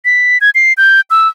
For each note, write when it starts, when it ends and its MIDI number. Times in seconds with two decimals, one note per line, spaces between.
0.05 0.38 95
0.41 0.50 92
0.55 0.73 96
0.77 1.01 91
1.10 1.28 88